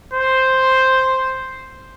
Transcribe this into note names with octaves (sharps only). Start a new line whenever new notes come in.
C5